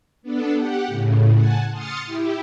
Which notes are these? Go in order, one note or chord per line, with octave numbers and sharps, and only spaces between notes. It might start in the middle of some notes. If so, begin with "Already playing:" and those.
B3 D4 A4
G4 F#5
A2 C#3
F#5 G#5 A5
C6 D#6 F6 A6 C#7
E4 G4